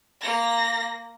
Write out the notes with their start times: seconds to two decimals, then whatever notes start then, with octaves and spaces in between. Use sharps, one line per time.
0.21 A#3 A#6